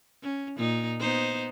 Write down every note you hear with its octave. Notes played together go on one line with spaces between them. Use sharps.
C#4
A#2 D#4
B3 D#4 C5